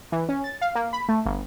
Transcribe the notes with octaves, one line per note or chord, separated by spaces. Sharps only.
E3
C#4
A6
F5
A#3
B5
A3
G1